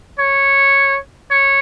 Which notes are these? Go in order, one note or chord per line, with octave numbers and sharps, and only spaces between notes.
C#5
C#5